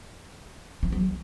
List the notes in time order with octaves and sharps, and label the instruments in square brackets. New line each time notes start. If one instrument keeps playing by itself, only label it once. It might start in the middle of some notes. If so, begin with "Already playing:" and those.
[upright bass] E3
F#3